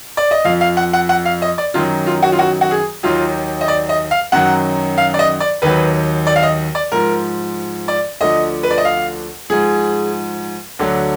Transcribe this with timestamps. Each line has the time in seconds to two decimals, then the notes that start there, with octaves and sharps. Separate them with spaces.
0.17 D5
0.31 D#5
0.45 F2 F3 F5
0.61 F5
0.77 F#5
0.93 F#5
1.09 F#5
1.25 F5
1.42 D#5
1.58 D5
1.74 F#2 D#3 F#3 F4
2.07 F4
2.23 F#4
2.32 F4
2.39 F#4
2.61 F#4
2.71 G#4
3.03 D#2 D#3 F#3 F4
3.61 D#5
3.68 D5
3.89 D#5
4.11 F5
4.32 F#2 D#3 F#3 F#5
4.98 F5
5.14 D5
5.19 D#5
5.40 D5
5.62 D#2 D#3 F#3 B4
6.27 D5
6.36 F5
6.43 D#5
6.75 D5
6.92 G#2 F3 A#4
7.88 D5
8.20 D2 D3 F3 D#5
8.63 B4
8.71 D5
8.78 D#5
8.85 F5
9.50 G#2 F3 G#4
10.79 D2 D3 F#3